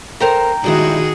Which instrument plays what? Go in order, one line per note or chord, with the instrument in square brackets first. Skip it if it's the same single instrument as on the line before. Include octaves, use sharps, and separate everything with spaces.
[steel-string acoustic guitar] A4 A#4 C5 [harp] G5 A#5
[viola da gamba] D#3 F#4 G#4 [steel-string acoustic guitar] G3 G#3 E4